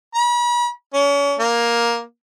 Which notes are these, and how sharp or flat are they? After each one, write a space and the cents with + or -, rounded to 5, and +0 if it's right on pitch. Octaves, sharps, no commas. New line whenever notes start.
B5 -40
C#4 +35
A#3 +10